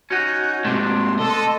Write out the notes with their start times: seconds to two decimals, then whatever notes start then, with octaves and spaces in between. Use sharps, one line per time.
0.10 C#4 D#4 F#4
0.65 G#2 C3 A3 D4 C6
1.19 A4 D#5